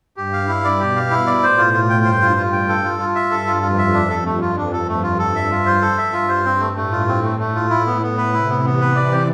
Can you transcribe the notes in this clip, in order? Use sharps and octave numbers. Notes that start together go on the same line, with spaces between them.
G2 G4
F5
G2 E4
D5
B2 G4
F5
E4
D5
A2 C5
F4
F4
G5
G2 C5
F4
F4
G5
A4
F4
F4
E5
G2 A4
F4
F2 F4
E5
D4
A4
G2 A3
F4
F2 D4
A4
G2 A3
F4
A4
E5
F4
C5
A4
E5
G2 F4
C5
C4
A3
A2 A3
F4
C4
A3
A2 A3
F4
A2 E4
B3
B3
B4
C3 E4
B3
E3 B3
B4
D5
G4